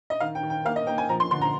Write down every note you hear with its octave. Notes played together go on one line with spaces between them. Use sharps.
D#5
D#3 F5
G5
D#3
G5
A#3 F5
D#5
A#3 G5
G#5
F3 A#5
C6
D3 C6
A#5